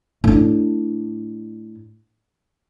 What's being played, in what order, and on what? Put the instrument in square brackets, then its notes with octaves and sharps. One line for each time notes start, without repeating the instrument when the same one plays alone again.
[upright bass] A2 D4